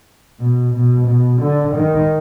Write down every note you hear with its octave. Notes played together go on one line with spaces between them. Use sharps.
B2
B2
B2
D3
D#3